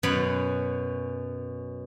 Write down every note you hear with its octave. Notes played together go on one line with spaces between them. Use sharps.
F#2 B2 F#3 C#4 F#5 B5